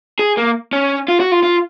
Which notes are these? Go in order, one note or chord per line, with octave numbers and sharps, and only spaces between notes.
G#4
A#3
C#4
F4
F#4
F4
F4